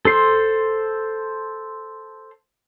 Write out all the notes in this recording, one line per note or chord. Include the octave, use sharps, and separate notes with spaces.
A4 C5 C6